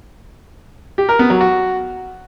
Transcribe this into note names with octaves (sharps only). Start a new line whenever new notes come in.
G4
A#4
B3
F#3
F#4